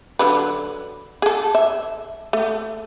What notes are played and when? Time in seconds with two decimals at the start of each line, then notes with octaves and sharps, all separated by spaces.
0.19 D3 F#3 B4
1.22 G#4 A4
1.55 E5
2.33 A3